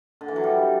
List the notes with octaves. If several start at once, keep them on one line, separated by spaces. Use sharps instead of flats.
D3
E3
F#3
G3